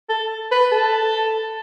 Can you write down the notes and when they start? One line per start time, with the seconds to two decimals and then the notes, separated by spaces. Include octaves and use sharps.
0.09 A4
0.51 B4
0.72 A4